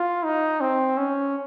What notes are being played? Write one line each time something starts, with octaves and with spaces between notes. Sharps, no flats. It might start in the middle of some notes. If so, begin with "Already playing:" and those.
Already playing: F4
D#4
C4
C#4